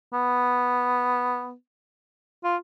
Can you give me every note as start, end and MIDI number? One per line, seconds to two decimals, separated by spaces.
0.13 1.53 59
2.44 2.56 65